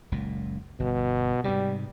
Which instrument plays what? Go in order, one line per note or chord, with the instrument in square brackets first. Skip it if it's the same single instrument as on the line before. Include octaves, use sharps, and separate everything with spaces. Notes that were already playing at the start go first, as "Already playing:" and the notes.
[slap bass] F#1 C#2 A#2
[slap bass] G1 [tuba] B2
[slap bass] G#2 C3 [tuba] G3